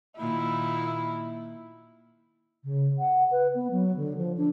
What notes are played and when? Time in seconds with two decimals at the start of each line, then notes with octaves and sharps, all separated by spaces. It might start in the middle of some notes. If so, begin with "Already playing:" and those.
0.19 A#2 D#3 E4
2.63 C#3
2.99 F#5
3.31 B4
3.55 B3
3.71 F#3
3.96 D3
4.18 F3
4.37 D4